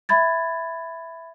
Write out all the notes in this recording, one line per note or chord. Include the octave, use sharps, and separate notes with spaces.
E5 B5 G#6 A6